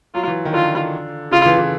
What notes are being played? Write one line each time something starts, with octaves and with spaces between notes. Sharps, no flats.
F#3 F4
E3
D#3
D3 F4
C#3 F4
E3
E3